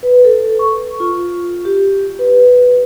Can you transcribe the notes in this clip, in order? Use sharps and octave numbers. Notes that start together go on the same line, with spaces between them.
B4
A4
C#6
F4
G4
B4
B4